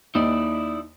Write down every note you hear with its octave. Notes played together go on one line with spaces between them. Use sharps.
D#2 D#4 E4 D5